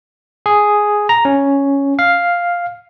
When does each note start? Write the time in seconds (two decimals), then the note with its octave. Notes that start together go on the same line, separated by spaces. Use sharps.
0.46 G#4
1.09 A#5
1.25 C#4
1.99 F5